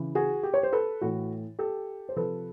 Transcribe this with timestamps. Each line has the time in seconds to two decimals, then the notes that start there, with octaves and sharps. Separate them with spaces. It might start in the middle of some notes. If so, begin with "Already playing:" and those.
Already playing: C#3 E3
0.15 F#4 G#4
0.43 G4
0.54 C#5
0.63 C5
0.72 A4 B4
1.01 A2 E3 F#4
1.59 G4 A4
2.09 C5
2.16 C3 F3 A4 B4